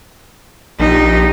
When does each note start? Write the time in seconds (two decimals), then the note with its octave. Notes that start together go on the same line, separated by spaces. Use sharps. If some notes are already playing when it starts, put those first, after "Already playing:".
0.79 A#1 D#4 G4